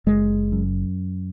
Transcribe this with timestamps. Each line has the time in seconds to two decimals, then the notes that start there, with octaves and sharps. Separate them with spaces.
0.06 F#1 G#3
0.52 F#2